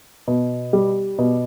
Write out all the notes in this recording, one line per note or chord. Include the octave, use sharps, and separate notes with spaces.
B2
G3
B2